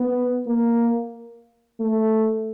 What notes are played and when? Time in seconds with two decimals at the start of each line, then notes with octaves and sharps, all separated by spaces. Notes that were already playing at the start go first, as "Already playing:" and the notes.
Already playing: B3
0.47 A#3
1.80 A3